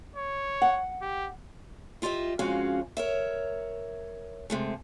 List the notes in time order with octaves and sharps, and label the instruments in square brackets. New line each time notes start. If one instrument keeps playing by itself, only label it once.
[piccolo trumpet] C#5
[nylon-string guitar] F#5
[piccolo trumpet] G4
[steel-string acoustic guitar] E4 F4 G4 D#5 E5
F2 C#3 G#3 C#4 F#4 F5
A#4 C#5 E5
C3 G#3 A3